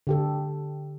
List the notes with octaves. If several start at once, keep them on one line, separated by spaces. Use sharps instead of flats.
D3 G4 A4